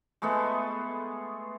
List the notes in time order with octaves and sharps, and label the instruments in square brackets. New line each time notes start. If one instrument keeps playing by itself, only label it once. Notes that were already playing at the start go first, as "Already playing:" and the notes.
[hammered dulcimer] G#3 A3 B3 A4